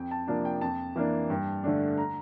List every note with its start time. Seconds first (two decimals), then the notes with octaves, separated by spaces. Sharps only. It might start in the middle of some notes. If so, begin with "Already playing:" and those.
Already playing: F2 G5
0.11 A5
0.28 C3 F3 A#3 D4 A5
0.45 G5
0.61 F2 A5
0.96 E3 A#3 D4
1.30 G2
1.64 D3 A3 D4
1.97 A#5